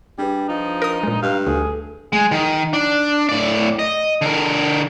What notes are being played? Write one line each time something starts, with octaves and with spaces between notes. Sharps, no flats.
G3 D4 G#4 B4
F3 D#4
A#4 D#6
A#2 G#3
G2 F5
D2 G#4 A4
G#3
D#3
D4
A2 D5
D#5
D3 A#4